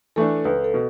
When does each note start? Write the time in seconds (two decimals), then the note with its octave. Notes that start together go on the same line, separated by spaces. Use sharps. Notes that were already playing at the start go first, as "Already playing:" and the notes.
0.16 E3 A3 D4 A4
0.44 C#2 B4
0.64 A4
0.74 B2